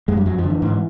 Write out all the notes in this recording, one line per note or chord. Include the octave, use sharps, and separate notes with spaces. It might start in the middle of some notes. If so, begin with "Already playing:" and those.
F#2 G#3
G3
F2 F#3
F3
D3
E3
G#2